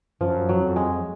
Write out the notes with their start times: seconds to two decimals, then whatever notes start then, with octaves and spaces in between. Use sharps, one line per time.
0.21 F#2 F3
0.49 F#3
0.55 F#2
0.63 F2
0.76 G#3